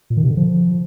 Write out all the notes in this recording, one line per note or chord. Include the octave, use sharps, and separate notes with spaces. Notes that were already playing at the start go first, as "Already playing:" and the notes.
A#2
D#3
C3
D3
F3